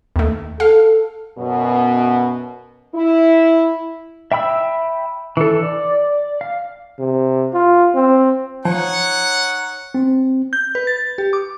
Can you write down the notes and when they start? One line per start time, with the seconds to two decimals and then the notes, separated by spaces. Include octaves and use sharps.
0.16 D#2 A3
0.60 A4 F5
1.38 F#2 B2
2.94 E4
4.32 E5 G5 B5 E6
5.37 E3 A4
5.63 D5
6.41 F5
6.99 C3
7.53 F4
7.95 C4
8.65 F3 D#4 C#5 F#5
9.94 C4
10.53 G6
10.75 B4
10.87 A6
11.18 G4
11.33 D6